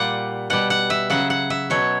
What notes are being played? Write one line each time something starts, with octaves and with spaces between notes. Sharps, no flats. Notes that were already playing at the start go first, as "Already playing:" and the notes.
Already playing: A#2 G3 F#5
B2 G3 F#5
F#5
E5
C#3 F#3 F#5
F#5
E5
B2 F#3 C#5